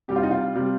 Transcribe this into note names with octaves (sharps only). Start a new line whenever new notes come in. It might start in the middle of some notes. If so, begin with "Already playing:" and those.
C3 G3 G4
F4
D#4
F4
C3 G3